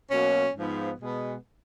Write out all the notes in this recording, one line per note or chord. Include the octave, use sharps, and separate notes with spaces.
B2 F#3 A#3 C#4
G#2 F3 B3
B2 G#3 B3